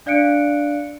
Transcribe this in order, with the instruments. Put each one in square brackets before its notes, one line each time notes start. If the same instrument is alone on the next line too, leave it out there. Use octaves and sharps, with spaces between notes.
[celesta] D4 D5 F5 F#6 C#7 D7